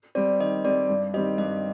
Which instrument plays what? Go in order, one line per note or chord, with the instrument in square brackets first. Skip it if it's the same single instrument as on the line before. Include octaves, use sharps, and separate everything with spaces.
[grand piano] G3 C4 [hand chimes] D5
[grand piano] D#3 [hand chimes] D#5
[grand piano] G3 C4 [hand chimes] D5
[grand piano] G2
[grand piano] D#3 G3 C4 G4 [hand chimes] D#5
[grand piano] G2 [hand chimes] D#5